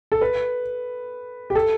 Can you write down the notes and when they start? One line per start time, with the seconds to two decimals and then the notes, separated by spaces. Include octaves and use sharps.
0.12 A4
0.21 B4
1.50 G4
1.55 A4